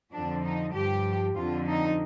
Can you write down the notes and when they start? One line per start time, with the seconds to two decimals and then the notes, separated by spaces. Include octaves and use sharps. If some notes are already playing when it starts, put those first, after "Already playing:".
0.13 F2 D3 F3 D4
0.44 D#4
0.75 G2 F3 G4
1.36 F2 D3 F3 F4
1.67 D#4